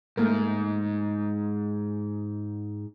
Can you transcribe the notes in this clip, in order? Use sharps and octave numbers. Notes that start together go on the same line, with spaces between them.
G#2 A3 A#3 A#4